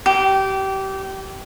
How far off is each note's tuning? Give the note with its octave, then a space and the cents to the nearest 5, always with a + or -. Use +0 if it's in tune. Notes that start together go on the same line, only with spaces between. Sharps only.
G4 -25